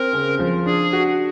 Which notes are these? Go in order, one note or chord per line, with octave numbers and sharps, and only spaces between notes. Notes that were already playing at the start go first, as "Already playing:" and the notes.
Already playing: C4 A#4
C#3
F3
D4 G#4
F#4